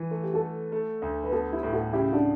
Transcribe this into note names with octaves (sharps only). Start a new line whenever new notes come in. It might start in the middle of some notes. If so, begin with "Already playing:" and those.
Already playing: E3
A3 A4
G4
F#4 A4
A3
A3
D2
B4
B3 F#4 A4
E4 G4
A2
F#4 A4
C#3 E4 G4
D4 F#4